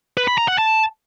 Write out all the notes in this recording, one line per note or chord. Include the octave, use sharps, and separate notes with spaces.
B4
B5
A#5
F#5
A5